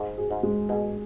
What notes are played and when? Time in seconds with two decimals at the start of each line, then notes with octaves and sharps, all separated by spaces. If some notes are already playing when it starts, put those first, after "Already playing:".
Already playing: G#2 G#4
0.17 G#4
0.31 G#2
0.43 G#3
0.69 B2 G#4